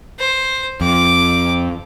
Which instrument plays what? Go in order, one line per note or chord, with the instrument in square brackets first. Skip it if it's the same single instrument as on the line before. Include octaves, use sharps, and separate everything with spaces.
[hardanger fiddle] C5
[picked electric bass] F2 [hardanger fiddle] D6